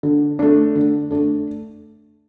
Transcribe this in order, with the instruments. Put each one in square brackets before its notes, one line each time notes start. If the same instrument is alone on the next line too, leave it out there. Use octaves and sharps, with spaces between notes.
[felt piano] D3
A3 D4
D3
A3 D4